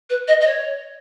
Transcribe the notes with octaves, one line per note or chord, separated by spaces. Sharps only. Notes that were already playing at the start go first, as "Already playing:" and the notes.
B4
D#5
D#5
C#5